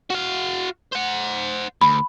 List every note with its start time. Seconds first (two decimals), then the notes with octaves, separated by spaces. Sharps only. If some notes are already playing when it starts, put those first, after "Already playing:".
0.10 F#4 F5
0.93 C5 F#5
1.81 D2 B5